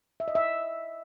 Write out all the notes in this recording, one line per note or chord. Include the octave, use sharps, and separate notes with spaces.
E5
D#5
E5